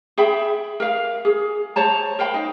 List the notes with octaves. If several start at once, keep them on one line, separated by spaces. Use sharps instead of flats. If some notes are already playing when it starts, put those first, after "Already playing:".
G#4 E5 G5 B5
A#4 F5
G#4
C5 C#5 A5 A#5
A#4 F5 G5 B5
D#4